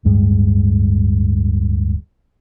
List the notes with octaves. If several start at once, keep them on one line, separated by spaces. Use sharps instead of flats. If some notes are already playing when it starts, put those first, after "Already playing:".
D1 G2 G#3